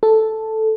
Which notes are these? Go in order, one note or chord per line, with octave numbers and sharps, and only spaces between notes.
A4